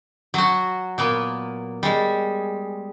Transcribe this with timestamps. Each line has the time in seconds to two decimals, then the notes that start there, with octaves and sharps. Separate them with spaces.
0.34 F#3 F#4
0.98 A#2 A#3 B3
1.83 G3 G#3